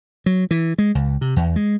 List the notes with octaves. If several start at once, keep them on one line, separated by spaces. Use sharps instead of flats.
F#3
E3
G#3
C#2
C3
E2
G#3